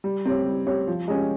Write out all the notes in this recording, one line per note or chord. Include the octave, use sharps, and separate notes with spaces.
G3
C4 G4 C#5
G3
C4 G4 C#5
F3
G#3 C#4 G4